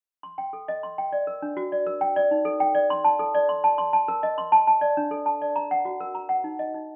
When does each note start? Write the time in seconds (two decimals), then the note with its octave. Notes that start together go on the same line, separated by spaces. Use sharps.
0.23 C6
0.38 G5
0.53 A4
0.68 D#5
0.83 C6
0.98 G5
1.13 D5
1.27 A#4
1.42 D4
1.57 F#4
1.72 D5
1.86 A#4
2.01 G5
2.16 D5
2.31 D#4
2.45 A4
2.60 G5
2.75 D5
2.90 C6
3.04 A5
3.19 A4
3.35 D5
3.49 C6
3.64 A5
3.78 C6
3.93 A5
4.08 A#4
4.23 D#5
4.38 C6
4.52 A5
4.67 A5
4.81 D5
4.97 D4
5.11 A4
5.26 A5
5.42 D5
5.56 A#5
5.71 F#5
5.85 F#4
6.01 A#4
6.15 A#5
6.29 F#5
6.44 D#4
6.59 D#5
6.74 D#4